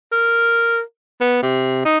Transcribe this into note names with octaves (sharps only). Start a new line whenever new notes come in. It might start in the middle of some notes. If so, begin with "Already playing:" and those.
A#4
B3
C3
D#4